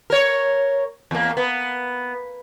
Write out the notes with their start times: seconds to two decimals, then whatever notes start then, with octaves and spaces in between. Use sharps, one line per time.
0.10 A#4 C#5
1.11 E2 A#3
1.37 B3